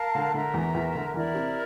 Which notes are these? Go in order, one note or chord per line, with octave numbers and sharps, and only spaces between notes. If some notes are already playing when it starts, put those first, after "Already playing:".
Already playing: A#4 F5 A5
D3
D3 A#4 E5 A#5
E2 E3
E2 E3
D3
E2 E3 E4 A#4 D5
C3 C4